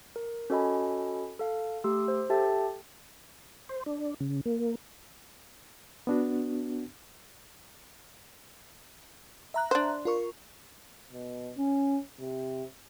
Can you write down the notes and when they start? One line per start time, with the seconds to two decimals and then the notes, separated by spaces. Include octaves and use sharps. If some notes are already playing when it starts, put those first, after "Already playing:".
0.16 A#4
0.50 C#4 F#4 A4 D#5 G#5 B5
1.39 A4 F5
1.84 A3 G4 C6 E6
2.08 C5
2.30 G4 A4 E5 G5 A5 A6
3.69 C5
3.86 D4
4.20 C#3
4.46 A#3
6.07 B3 D4 F#4
9.54 E5 A#5 F#6
9.71 D4 C5
10.05 F4 A#4 C#6
11.13 B2
11.58 C#4
12.20 C3